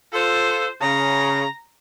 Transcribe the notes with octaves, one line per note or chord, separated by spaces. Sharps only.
F4 A4 C5
C#3 A#5